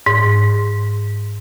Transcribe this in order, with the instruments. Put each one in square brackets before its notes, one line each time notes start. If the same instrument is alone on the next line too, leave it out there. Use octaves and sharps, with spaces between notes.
[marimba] G#2